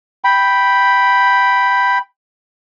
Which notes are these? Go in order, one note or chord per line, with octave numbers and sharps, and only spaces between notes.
G5 B5